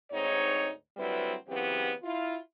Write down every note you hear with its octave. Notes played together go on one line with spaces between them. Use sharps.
D2 G#2 C4 D#4 C#5
D2 F#3 G3 C4 E4 B4
C#3 E3 F#3 B3 C4 G4
E4 F4